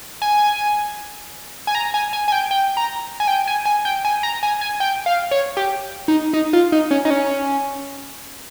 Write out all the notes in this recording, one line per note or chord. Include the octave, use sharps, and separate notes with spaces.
G#5
G#5
A#5
G#5
G#5
G#5
G5
G5
A#5
G#5
G5
G#5
G#5
G5
G#5
A#5
G#5
G#5
G5
F5
C#5
G4
D#4
D#4
F4
D#4
C#4
D#4
C#4